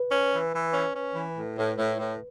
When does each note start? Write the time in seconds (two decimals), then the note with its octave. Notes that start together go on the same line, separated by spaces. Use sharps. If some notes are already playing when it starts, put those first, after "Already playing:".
Already playing: B4
0.10 C#4
0.32 E3
0.53 E3
0.73 C#4
0.95 C#4
1.15 E3
1.36 A2
1.57 A2
1.77 A2
1.98 A2